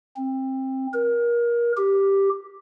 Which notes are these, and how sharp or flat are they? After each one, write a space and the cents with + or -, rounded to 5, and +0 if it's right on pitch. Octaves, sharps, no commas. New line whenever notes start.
C4 +20
A#4 +25
G4 +0